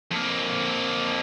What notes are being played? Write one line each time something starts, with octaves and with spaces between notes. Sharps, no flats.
F2 A#3